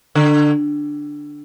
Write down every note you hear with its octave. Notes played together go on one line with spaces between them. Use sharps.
D3